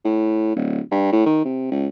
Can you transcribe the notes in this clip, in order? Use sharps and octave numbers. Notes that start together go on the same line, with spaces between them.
A2
D1
G2
A2
D#3
C3
C#2